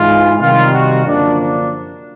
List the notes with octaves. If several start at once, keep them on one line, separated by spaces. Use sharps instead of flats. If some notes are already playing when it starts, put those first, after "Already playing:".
Already playing: G#2 E3 G#3 F4
C3 D#3 G3 F4
F#4
F#2 D3 F3 A#3 D4
D4